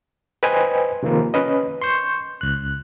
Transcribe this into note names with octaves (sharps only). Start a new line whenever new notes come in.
B4 C5 D#5 G5 G#5
C3 D#3 F3 A#3 F4
C#4 B4 D#5
C6 C#6 G6
C#2 F#6